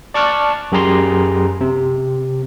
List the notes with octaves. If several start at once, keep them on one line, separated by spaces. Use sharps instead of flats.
D5 A5 C#6 D6 F6 F#6
F#2 G4 G#4 A#5 C6
C3